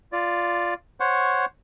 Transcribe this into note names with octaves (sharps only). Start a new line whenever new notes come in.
F4 D5
C5 C#5 F#5 C#6